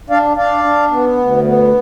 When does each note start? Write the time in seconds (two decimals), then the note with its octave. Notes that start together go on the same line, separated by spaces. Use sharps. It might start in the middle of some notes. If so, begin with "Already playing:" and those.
0.10 D4 D5 F5
0.37 D4 D5 F5
0.64 D4
0.91 B3
1.18 D2
1.44 B3